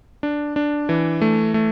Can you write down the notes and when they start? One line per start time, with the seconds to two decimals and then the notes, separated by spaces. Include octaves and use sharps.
0.23 D4
0.56 D4
0.89 E3
1.21 A3
1.54 A3